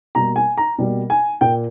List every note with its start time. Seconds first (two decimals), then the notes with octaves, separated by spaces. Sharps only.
0.15 B2 G3 A#3 A#5
0.36 G#5
0.57 A#5
0.78 B2 G3 A#3
1.10 G#5
1.41 A#2 A#3 G5